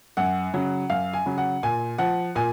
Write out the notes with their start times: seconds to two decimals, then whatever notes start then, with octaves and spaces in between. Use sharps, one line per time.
0.17 F#2 F#5
0.54 C#3 F#3
0.90 F#2 F5
1.13 G#5
1.26 C#3 F#3
1.38 F#5
1.63 A#2 G#5
1.98 F3 F#5
2.36 A#2 G#5